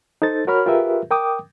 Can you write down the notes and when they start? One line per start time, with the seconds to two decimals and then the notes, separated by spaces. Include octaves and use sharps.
0.22 D#4 A4 C5 A6
0.47 F#4 A#4 C#5 B5 F6
0.66 F4 G4 G#4 A#4 B4 E5
1.11 A#4 G5 D6 D#6